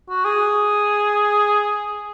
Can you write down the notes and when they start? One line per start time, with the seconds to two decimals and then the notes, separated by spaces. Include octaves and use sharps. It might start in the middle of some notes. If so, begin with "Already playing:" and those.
0.09 F#4
0.25 G#4